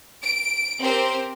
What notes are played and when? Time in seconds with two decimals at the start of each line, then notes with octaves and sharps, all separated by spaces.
0.25 D7
0.80 C4 G4 A#4 C5